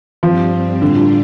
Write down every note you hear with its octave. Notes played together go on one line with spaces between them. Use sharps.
G2 F3 G3 C4
A2 D3 G3 D4 F4